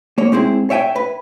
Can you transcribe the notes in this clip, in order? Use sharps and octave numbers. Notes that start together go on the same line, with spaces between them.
A#3 C#5
G#3 C4 E4 G#4
C#5 E5 G5 G#5
B4